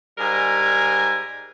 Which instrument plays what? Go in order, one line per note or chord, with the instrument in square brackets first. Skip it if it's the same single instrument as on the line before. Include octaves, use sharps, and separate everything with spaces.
[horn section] G#2 G3 A#4 G#5